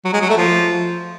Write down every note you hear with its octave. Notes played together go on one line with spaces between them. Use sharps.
F#3
G#3
F#3
A3
F3